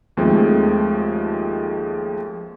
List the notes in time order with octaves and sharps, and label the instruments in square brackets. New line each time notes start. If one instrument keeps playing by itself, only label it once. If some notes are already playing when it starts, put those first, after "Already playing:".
[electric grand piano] D#2 F3 G#3 A3 C4